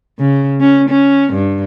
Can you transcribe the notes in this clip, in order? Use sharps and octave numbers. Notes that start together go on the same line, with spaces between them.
C#3
C#4
C#4
G2